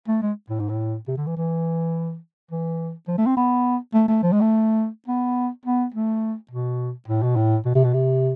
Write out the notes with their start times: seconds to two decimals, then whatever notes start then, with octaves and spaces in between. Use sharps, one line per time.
0.08 A3
0.22 G#3
0.50 A2
0.60 G#2
0.69 A2
1.08 C3
1.17 D3
1.27 E3
1.37 E3
2.51 E3
3.08 F3
3.18 A3
3.26 C4
3.37 B3
3.93 A3
4.08 A3
4.23 F3
4.32 G#3
4.41 A3
5.08 B3
5.66 B3
5.94 A3
6.51 B2
7.08 A2
7.23 B2
7.36 A2
7.65 B2
7.75 C3
7.84 B2
7.94 C3